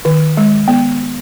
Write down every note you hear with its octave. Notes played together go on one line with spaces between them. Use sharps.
D#3
G#3
B3